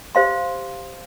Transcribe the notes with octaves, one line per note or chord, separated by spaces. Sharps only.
G4 C5 F5 C6